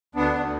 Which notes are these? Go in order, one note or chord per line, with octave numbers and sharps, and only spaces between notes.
D2 B3 D4
D2